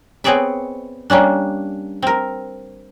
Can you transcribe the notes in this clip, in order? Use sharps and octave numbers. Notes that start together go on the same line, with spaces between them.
B3 C4 G#4 C#5 D5 E5
G3 A#3 C#4 D4
C4 A#4